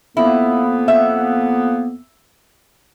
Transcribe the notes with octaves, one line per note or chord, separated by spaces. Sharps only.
F2 A#3 B3 E4
E5